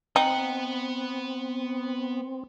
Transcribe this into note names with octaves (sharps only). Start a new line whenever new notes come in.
B3 C4 D#4 F#5 G5